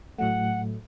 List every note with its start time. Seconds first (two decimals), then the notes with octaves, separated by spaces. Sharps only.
0.19 A2 F#3 A3 F#5